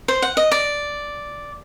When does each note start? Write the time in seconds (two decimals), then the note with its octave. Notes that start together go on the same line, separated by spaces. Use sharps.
0.08 C5
0.22 F#5
0.37 D#5
0.52 D5